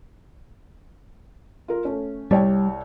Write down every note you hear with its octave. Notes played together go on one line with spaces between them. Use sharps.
F4 A#4
A3 C#4
C2 G3 C#5 G5